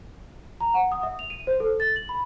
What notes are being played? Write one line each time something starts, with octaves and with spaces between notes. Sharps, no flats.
A#5
F#5
D#6
E5
F7
D#7
C5
A4
A6
F#7
B5